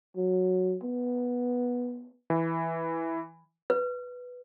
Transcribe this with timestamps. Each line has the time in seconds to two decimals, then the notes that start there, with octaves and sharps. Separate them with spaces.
0.16 F#3
0.83 B3
2.30 E3
3.70 B4